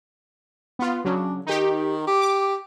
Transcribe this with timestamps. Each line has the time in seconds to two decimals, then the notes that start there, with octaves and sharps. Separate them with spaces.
0.79 B3 F4
1.05 C#3 F#3 D4
1.47 D#3 D#4 G4
2.07 G4
2.21 D6